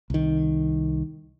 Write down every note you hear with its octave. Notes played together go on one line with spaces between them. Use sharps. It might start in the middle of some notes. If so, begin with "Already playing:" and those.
C2 D#3